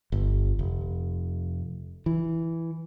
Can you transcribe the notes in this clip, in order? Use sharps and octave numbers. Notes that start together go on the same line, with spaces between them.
G1
F1
E3